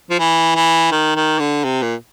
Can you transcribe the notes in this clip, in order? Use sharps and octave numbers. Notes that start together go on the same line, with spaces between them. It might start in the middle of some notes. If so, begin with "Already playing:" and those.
F3
E3
E3
D#3
D#3
D3
C3
A#2